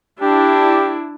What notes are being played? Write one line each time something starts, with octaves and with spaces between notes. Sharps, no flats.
D4 E4 G4